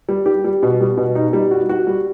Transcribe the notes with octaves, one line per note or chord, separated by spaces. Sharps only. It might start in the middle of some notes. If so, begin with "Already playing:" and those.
G3
G4
G3
B2
G3
B2
D#4
G3
F#4
F#4
G3